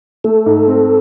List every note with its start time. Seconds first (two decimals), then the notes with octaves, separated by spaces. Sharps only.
0.24 A3 A4
0.46 G#2
0.68 C4